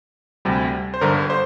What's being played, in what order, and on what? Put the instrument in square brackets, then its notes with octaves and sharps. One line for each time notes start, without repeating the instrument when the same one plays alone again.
[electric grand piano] D2 C3 G3
C5
G1 G2 D3 A#4
C5